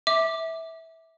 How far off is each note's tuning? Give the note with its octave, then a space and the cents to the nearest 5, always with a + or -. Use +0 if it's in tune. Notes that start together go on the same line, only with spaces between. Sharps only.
E5 -15 D6 +5